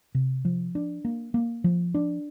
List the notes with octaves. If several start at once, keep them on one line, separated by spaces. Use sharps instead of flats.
C3
F3
D4
A#3
A#3
F3
D4